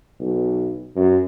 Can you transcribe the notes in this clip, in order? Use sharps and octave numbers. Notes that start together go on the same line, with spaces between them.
B1
F#2